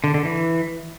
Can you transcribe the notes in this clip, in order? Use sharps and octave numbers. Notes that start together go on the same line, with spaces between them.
D3
D3
E3